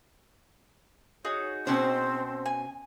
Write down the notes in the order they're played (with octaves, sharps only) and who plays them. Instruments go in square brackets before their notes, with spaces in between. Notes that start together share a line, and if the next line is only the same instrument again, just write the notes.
[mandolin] D#4 F#4 G#4 [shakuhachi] C#5
[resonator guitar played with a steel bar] B2 C#4 C5 [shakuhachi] C4
[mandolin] G#5